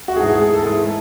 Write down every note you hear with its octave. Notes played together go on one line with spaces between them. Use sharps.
F#4
G#2 E3 A3 G#4
G#4
G#4
A4
G#2 E3 A3 G#4